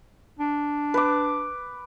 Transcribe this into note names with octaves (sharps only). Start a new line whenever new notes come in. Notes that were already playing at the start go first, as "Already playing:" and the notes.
D4
B4 D6